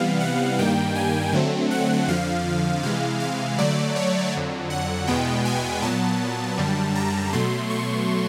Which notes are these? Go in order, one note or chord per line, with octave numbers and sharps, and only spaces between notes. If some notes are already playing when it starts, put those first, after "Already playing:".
Already playing: C3 E3 G3 B3 F5
F#5
G2 D#3 G3 A#3 G5
G#5
D3 F#3 A3 C4
F#5
F2 D3 F3 F5
C3 E3 G#3 F5
F5
D3 F#3 A3 D5
C#5
F2 D3 F#3
F#5
E2 B2 G#3 B3 G5
G#5
A#2 F#3 B3 A5
F#2 D3 G3
A#5
B2 F#3 A3 C6
C#6